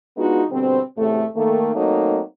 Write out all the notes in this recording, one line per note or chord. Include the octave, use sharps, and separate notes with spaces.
G#3 B3 D4 D#4 F4 F#4
B2 D3 G3 C4
E2 A2 C3 A3
D#3 A3 A#3
F#3 A3 A#3 C4 D#4